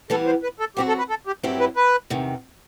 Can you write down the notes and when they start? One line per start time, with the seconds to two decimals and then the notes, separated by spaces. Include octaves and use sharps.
0.10 E3 G3 B3 A4
0.26 C5
0.43 B4
0.60 A4
0.77 F#3 C4 F#4 G4
0.88 A4
0.98 B4
1.10 A4
1.27 G4
1.43 G2 F#3 C4 E4 G4
1.60 B4
1.76 B4
2.10 E2 C3 D#3